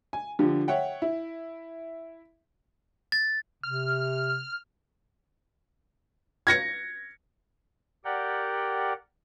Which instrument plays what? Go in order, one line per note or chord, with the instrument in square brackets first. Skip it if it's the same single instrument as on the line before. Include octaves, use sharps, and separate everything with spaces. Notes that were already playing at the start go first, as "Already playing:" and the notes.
[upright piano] G#5
D3 F3 G4
C#5 E5 F#5 G5
E4
[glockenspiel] A6
[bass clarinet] C3 [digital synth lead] F6
[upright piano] G#6 A#6 C#7
[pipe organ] G4 A#4 D5 F#5 G5